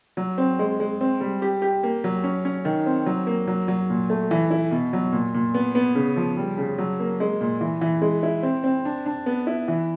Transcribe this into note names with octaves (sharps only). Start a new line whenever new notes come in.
F#3
C4
G#3
G#3
C4
G3
G4
G4
A#3
F#3
C#4
C#4
D#3
C4
F#3
A#3
F#3
F#3
A#2
A3
E3
E4
B2
F#3
A#2
A#2
B3
B3
C#3
F3
G3
C#3
F#3
A#3
G#3
A#2
E3
E3
G#3
E4
C4
C4
D4
D4
B3
E4
E3